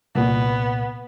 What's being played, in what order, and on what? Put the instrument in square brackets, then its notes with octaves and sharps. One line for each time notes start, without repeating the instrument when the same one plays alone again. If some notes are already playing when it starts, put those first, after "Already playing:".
[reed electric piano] C2 A#2 [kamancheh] B3